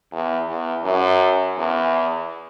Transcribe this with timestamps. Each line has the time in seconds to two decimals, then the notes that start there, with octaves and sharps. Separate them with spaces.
0.12 E2
0.48 E2
0.84 F#2
1.57 E2